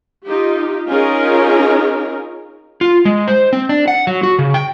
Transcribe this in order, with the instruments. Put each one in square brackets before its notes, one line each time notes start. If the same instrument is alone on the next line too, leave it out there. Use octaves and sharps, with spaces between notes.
[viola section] D#4 F4 G4
C#4 D#4 F4 G#4 A#4 C#5
[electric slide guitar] F4
G#3
C5
C4
D4
F#5
F#3
F#4
C#3
G5